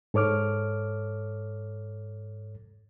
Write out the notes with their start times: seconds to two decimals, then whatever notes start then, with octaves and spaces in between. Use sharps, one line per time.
0.14 G#2 A4 C#5 D6 F6